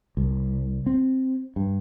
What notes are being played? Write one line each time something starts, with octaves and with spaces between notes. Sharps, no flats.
C2
C4
G2